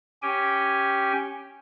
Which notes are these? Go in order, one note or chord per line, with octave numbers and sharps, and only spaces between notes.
C#4 G4 G5 G#5